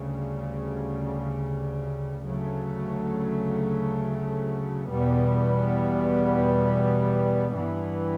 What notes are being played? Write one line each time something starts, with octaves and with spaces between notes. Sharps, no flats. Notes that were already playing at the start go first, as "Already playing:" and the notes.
Already playing: D2 C#3 G3
D2 C#3 F#3 A3
E2 B2 G3 B3
G2 E3 G3 B3